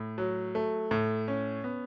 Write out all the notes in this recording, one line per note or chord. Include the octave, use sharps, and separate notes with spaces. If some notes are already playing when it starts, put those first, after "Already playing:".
Already playing: A2
F#3
A3
A2
C#4
B3